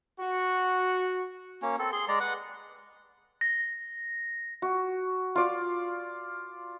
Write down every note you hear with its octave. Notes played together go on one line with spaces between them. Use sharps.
F#4
A#3 C#4
C4 A4
G#4 C6
G#3 D5 A#5
B4 F#5
A#6
F#4
F4 D5